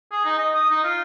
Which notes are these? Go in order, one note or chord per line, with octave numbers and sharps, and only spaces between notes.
G#4
D#4
D#5
D#6
D#4
F4